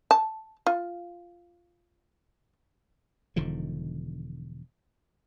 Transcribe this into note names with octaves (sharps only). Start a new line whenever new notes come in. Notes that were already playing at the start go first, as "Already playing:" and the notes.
A5
F4
E1 D3 D#3 F3